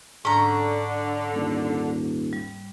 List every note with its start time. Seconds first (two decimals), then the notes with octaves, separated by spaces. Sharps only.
0.25 G#2 D3 C#4 A#5
1.35 D#1
2.33 G3